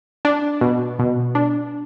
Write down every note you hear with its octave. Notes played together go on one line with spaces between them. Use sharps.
D4
B2
B2
D4